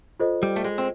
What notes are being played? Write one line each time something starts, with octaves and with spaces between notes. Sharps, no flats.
F4 A4 C5 D#5
G3
A3
G#3
C4